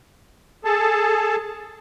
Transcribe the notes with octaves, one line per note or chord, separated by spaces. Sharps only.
G#4 A4 A5